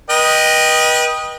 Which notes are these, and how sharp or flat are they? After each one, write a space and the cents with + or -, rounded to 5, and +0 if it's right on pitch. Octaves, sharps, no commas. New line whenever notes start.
B4 -35 D#5 +0 G5 +0